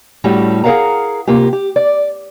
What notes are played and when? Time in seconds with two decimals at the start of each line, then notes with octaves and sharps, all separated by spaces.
0.24 A2 G3 C#4 D4 F#4 G4
0.64 G#4 A#4 C5 F5 F#5 A#5
1.27 C3 A#3 F4 G4
1.53 G4
1.76 D5